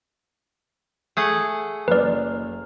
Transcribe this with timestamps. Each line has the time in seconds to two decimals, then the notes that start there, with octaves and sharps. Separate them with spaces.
1.17 A3 G#4 F#5
1.88 F#1 B4 D5 F6